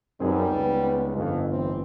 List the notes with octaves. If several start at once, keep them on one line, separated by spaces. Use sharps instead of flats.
F#2 G3 B3 C4 D#4 G#4 A#4
C#2 B3
G1 F2
A1 C4